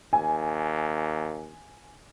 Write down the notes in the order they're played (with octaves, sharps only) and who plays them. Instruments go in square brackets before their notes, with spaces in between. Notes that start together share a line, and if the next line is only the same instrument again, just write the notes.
[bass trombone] D#2 [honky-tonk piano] G#5